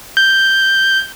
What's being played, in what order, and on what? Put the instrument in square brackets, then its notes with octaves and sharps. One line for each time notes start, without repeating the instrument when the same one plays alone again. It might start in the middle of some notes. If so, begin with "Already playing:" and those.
[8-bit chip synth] G6